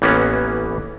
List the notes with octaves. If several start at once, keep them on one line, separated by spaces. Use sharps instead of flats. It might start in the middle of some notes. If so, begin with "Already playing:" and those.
A1 E3 A#3 B3 C#4 F#5